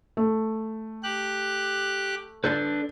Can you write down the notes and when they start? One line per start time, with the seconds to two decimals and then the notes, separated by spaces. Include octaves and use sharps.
0.17 A3
1.03 G4 F#6
2.44 D4 A4 B4 G6